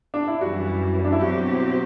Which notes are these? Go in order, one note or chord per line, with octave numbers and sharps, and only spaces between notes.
D4
E4
F#2 E3 G3 F#4
D4
E4
B2 F#3 C4 F#4 G4